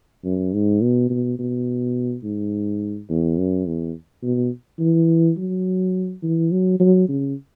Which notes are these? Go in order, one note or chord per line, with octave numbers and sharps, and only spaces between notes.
F#2
G#2
B2
B2
B2
G#2
E2
F#2
E2
B2
E3
F#3
E3
F#3
F#3
C#3